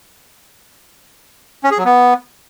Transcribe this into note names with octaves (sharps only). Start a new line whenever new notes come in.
C#4
G#4
F#3
B3